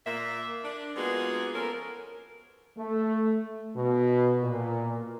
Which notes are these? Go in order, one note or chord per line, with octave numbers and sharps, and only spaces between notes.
A#2 A#3 E5
D4
G#3 A#3 B3 F4 F#4 G#4
F3 B3 C#4 A4 A#4
A3
B2
A#2